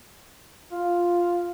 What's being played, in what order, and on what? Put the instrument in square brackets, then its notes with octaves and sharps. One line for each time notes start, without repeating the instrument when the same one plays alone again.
[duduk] F4